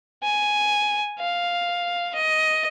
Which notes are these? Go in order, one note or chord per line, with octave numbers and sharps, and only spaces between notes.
G#5
F5
D#5